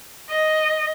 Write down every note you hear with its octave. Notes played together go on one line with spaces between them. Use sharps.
D#5